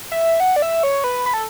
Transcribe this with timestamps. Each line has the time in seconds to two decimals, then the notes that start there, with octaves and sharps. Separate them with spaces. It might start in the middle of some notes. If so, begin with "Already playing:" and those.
0.12 E5
0.40 F#5
0.56 D5
0.62 E5
0.83 C#5
1.04 B4
1.26 B4
1.34 A4